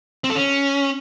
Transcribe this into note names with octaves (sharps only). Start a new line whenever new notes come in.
C4
A4
C#4